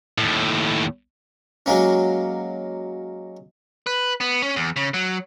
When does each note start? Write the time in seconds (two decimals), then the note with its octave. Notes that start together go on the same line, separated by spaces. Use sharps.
0.18 D#2 A2
1.66 F#3 G#3 A#3 C#4
3.87 B4
4.20 B3
4.42 C#4
4.56 E2
4.76 C#3
4.94 F#3